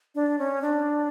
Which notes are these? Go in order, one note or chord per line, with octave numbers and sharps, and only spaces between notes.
D4
C#4
D4